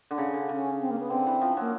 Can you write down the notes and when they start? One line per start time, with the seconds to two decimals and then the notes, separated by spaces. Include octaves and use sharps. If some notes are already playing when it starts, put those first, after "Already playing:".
0.11 D3
0.18 C#3
0.33 D3
0.48 C#3 C#4
0.80 C4
0.91 A#3
1.00 B3
1.10 D3 C4
1.26 E3
1.41 F3
1.57 F#3 A#3